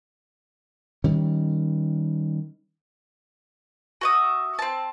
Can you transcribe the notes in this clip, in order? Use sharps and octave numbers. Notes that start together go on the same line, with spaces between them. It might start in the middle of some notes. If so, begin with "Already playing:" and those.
D#3 G3 C#4
F#4 E5 D#6
C4 A5